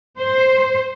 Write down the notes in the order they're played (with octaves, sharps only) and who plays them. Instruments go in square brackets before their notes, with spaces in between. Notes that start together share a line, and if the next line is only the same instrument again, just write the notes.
[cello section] C5